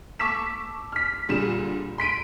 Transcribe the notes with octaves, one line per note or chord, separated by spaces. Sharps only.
A5 C#6 D6 E6 B6 E7
F6 B6
A#2 D3 G3 G#4 E7
C6 B6 D7 D#7